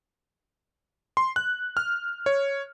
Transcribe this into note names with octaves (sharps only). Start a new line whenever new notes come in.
C6
F#6
F6
C#5